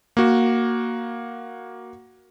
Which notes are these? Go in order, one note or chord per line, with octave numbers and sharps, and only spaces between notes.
A#3 F#4